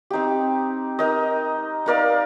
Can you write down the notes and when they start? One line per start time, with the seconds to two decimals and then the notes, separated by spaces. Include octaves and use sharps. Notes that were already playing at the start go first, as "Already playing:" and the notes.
0.10 C4 D#4 G4
0.99 D#4 A#4 D#5
1.86 D#4 A#4 D5 F5